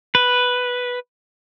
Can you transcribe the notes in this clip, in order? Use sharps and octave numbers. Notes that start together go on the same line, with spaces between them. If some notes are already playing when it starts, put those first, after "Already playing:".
B4